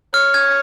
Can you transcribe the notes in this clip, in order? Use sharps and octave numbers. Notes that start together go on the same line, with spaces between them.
C#5 F6
G#6